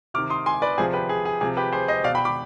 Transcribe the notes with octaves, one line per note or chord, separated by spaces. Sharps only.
C3 D#3 D6 F6
C6 D#6
G#5 C6
B4 D5
C3 F3 G#4 C5
G4 B4
G#4
G#4
C3 F3 G#4
G4 B4
G#4 C5
C5 D#5
B2 D5 F5
G5 B5
B5 D6